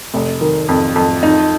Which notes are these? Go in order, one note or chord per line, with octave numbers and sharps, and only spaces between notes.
F1
D#3
F2
F2
D#4